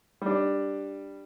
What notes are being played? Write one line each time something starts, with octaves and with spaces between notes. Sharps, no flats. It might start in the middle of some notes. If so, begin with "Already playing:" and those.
G3 D4